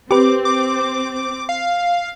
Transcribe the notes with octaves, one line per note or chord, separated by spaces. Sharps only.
C4 G4 B4 D6
D6
F5